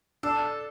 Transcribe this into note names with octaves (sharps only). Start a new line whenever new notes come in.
D4 A4